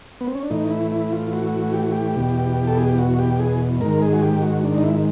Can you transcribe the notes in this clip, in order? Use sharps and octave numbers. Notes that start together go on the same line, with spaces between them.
B3
C4
C#4
D4
A2 E3 D#4
E4
E4
F4
F#4
G4
F#4
G4
E2 B2
A4
G#4
G4
F#4
G4
G#4
G#2 D#3 A#4
G#4
F#4
G4
F#4
D4
D#4
E4